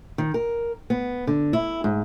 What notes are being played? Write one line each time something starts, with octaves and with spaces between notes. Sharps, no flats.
D#3
A#4
B3
D3
E4
G#2